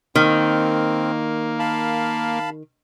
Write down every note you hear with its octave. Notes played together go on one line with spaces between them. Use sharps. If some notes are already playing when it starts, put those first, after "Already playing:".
D#3 A#3 C4
F5 A5 B5